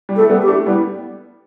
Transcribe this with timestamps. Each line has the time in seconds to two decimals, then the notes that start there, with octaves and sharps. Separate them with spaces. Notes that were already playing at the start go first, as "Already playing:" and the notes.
0.09 G3
0.16 A4
0.19 A3
0.29 G3 B3
0.42 G4
0.48 A3 D4
0.66 G3 B3 E4